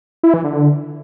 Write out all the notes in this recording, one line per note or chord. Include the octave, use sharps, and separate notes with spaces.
E4
E3
D3